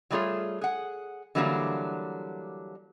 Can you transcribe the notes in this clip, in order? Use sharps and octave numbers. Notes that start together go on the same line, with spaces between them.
F#3 G3 A3 F4 G#4 C#5
G#4 F#5
D3 E3 F#3 G3 A#3 D4